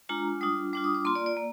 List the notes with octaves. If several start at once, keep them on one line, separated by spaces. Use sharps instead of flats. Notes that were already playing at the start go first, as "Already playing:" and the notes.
G#3 D4 F4 A#5
G3 D4 F4 D#6
G3 D4 F4 D6
D#6
D6
A#3 F4 C6
D5
D5
A#3